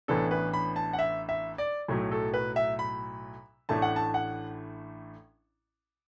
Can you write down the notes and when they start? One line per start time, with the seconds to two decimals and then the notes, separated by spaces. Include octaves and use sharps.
0.08 A1 A2 E3 B3 D4 A4
0.31 B4
0.53 B5
0.76 A5
0.93 F#5
0.99 E5
1.29 E5
1.58 D5
1.88 B1 A2 F#3 A3
2.11 A4
2.34 B4
2.56 E5
2.79 B5
3.69 A1 A2 A3 D4 A5
3.82 F#5
3.96 A5
4.14 F#5